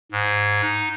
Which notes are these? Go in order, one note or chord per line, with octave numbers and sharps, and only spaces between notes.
G#2
D#4